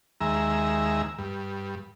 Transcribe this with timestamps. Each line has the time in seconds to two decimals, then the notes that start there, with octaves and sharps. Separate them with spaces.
0.21 D#2 G#3 E5 A#5
1.18 G2